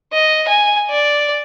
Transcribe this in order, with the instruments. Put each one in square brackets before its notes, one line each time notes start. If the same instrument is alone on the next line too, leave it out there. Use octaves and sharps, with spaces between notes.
[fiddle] D#5
G#5
D5